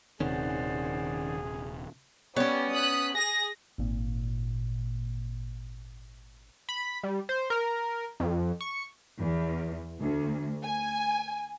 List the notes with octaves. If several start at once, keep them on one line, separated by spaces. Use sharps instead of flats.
D#1 C3 D#3 C#4 G#4 C5 D5 F#5
G3 B3 C#4 C#5
D#6 F#6 B6
G#4 A#6
G#1 A#2
B5
G3
C5
A#4
F2
C#6
E2
D2
G#5